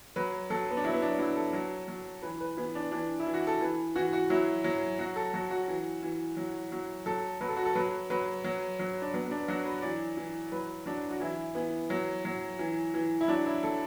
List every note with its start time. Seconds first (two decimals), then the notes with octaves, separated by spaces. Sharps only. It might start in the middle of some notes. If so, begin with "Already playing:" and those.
0.16 F#3 B4
0.50 F#3 A4
0.71 B3
0.77 D4
0.85 F#3 E4
0.94 B3
1.02 D4
1.19 F#3 E4
1.36 A4
1.53 F#3
1.88 F#3
2.22 E3 B4
2.41 B4
2.57 E3 B3
2.75 D4
2.92 E3 D4
3.20 E4
3.27 E3
3.34 F#4
3.47 A4
3.61 E3 B4
3.96 E3 F#4
4.13 F#4
4.30 F#3 E4
4.64 F#3
4.99 F#3 F#4
5.16 A4
5.34 F#3 F#4
5.51 F#4
5.68 E3
6.03 E3
6.37 F#3
6.72 F#3
7.06 F#3 A4
7.41 F#3 B4
7.49 A4
7.57 F#4
7.65 A4
7.75 F#3 B4
8.10 F#3 B4
8.44 F#3
8.79 F#3
9.02 D4
9.14 F#3 B3
9.26 B3
9.31 D4
9.48 F#3 F#4
9.65 B4
9.82 E3 D5
10.17 E3
10.52 F#3 B4
10.86 F#3 D4
11.11 F#4
11.20 E3 E4
11.55 E3 B3
11.90 F#3
12.25 F#3
12.59 E3
12.94 E3
13.21 E4
13.28 F#3 D4
13.46 E4
13.63 F#3 A4